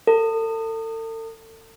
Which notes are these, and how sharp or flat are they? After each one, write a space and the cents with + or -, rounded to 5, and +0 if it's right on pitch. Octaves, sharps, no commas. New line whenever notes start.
A4 +40